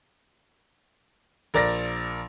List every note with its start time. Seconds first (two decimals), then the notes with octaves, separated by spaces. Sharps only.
1.54 A#1 A#4 D5 A6 A#6